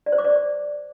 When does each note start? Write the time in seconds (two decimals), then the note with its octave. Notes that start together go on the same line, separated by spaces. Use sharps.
0.06 D5
0.12 C5
0.18 D6
0.24 D5